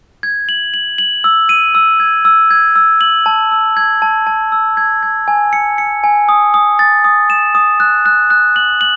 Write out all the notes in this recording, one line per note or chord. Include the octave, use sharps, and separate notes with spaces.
G#6
F#7
F#7
F#7
E6
D#7
E6
G#6
E6
G#6
E6
F#7
A5
E6
G#6
A5
A5
E6
G#6
G#6
G#5
C#7
C#7
G#5
D#6
D#6
A6
D#6
E7
D#6
F#6
F#6
F#6
F#7
F#7